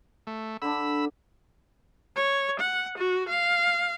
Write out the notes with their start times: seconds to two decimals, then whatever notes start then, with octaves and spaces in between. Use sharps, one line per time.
0.27 A3
0.62 D3 D4 B5 E6
2.16 C#5
2.60 F#5
2.98 F#4
3.29 F5